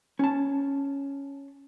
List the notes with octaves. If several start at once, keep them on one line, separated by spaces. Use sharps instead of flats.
C#4 A5